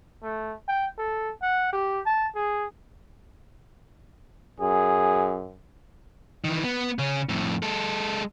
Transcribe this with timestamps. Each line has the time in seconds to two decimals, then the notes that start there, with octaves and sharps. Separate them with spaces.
0.23 A3
0.68 G5
0.98 A4
1.42 F#5
1.73 G4
2.06 A5
2.35 G#4
4.60 F#2 G#4
6.44 D#3 E3
6.64 B3
6.99 C#3 C#4
7.29 F2 A2
7.63 G#3 A4